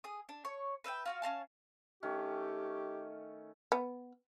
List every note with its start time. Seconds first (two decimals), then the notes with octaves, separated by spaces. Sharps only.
0.04 G#4 D#6
0.29 D4
0.45 C#5 C#6
0.84 B4 E5 F5 G5
1.05 F4 F#4 F5
1.22 C#4 D#5 F5 A5
2.03 D#3 A3 C#4 G4
3.72 B3